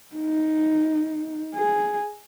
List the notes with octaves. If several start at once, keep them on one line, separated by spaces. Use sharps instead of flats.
D#4
G#4